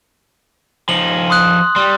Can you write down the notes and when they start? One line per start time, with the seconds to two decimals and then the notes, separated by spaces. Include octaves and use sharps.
0.89 F3 D#4 F#7
1.30 C6 D#6 F#6
1.76 G3 C6